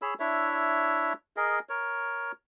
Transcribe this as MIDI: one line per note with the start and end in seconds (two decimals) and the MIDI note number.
0.02 0.14 68
0.02 0.14 73
0.02 0.14 83
0.02 0.14 88
0.20 1.13 62
0.20 1.13 64
0.20 1.13 73
0.20 1.13 76
1.37 1.59 68
1.37 1.59 70
1.37 1.59 75
1.69 2.32 70
1.69 2.32 73